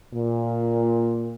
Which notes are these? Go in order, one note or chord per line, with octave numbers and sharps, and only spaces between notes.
A#2